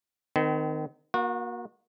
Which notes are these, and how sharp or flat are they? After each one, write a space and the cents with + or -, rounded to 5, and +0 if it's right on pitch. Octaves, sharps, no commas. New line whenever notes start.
D#3 -15 C4 -45
A#3 +25 F#4 -30